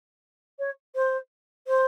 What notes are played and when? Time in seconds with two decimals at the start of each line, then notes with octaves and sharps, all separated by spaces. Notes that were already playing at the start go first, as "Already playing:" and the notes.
0.59 C#5
0.95 C5
1.67 C5